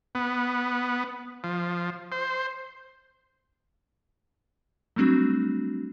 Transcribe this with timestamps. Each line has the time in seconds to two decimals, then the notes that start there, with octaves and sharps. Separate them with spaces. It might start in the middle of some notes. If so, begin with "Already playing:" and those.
0.15 B3
1.44 F3
2.12 C5
4.96 F#3 G3 A3 C4 D4 F#4